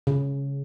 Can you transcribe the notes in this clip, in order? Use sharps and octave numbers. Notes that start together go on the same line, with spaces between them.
C#3